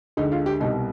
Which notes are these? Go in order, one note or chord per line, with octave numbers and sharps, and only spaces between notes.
D2 D3 G#3 D#4
F4
G4
C2 B2 G3 D#4